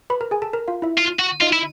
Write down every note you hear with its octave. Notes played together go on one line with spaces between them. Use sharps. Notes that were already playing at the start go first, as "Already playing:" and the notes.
B4 B5
A#4 A#5
G#4 G#5
A4 A5
A#4 A#5
F4 F5
E4 E5
F4
F#4
D#4 F4 D#5
E4